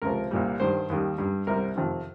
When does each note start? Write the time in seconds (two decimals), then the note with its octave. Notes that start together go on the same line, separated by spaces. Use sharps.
0.02 C#2 C3 F3 A#4
0.31 C2 A#2 G3
0.60 G2 D#3 G3 C5
0.90 D#2 D#3 G3
1.18 G2 G3
1.47 C2 C3 G3 A#4
1.76 F2 C3 D#3